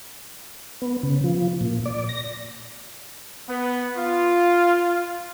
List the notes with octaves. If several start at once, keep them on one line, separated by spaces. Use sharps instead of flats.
B3
C#3
F3
A#2
D5
A#6
B3
F4